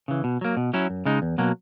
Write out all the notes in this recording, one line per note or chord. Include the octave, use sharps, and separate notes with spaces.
C#3 E3
B2
F#3 A#3
B2
F#3 C#4 E4
F#2
C#3 G#3 D#4
E2
B2 F#3 A#3